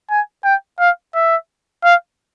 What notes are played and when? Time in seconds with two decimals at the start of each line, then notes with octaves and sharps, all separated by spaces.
0.10 G#5
0.44 G5
0.80 F5
1.15 E5
1.84 F5